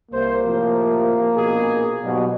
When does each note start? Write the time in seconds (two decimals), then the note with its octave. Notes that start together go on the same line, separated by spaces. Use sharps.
0.11 C2 A#3 C5
0.44 A2 C3 F3
1.36 A#1 B2 G#4
2.03 G#2 B2 F#3 G3